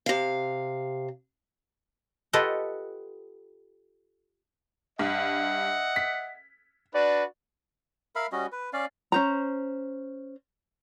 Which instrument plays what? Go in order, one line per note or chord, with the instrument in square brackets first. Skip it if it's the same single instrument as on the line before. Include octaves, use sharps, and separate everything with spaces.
[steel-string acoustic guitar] C3 F5
[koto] F4 G4 A4 B4 D#5 F#5
[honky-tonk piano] G2 [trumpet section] D#5 E5 F#5
[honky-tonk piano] B6
[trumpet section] D4 F#4 B4 [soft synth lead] D5
[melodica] A#4 E5 F5 B5
G3 C#4 F#4 D#5
B4
C#4 D5 F5
[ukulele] C#4 C5 A#5